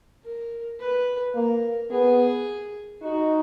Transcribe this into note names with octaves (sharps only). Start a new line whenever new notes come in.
A#4
B4
A#3 A#4
B3 G#4
D#4 F#4